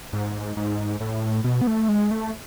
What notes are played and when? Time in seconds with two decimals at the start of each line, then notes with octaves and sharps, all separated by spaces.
0.13 G#2
0.57 G#2
1.01 A2
1.44 B2
1.61 B3
1.67 A3
1.88 G#3
2.11 A3